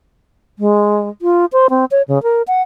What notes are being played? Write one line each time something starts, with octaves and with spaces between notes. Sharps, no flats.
G#3
F4
C5
C4
C#5
C#3
A#4
F#5